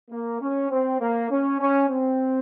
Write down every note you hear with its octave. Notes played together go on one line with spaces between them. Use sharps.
A#3
C#4
C4
A#3
C#4
C#4
C4